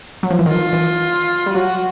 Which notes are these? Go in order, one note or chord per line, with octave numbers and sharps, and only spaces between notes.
F#3
F3
E3
D#3 F4
E3
G3
F#3 F#4